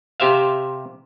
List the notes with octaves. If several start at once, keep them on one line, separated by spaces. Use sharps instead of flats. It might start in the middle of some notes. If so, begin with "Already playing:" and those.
C3 G4 C5 E5 F5